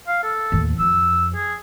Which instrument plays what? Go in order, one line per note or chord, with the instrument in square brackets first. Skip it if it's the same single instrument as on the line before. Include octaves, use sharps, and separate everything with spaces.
[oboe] F5
A4
[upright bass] D#2 A2
[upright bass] F2 [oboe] E6
[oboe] G#4